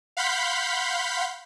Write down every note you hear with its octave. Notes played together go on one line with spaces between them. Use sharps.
F5 F#5 B5 C6 G6 B6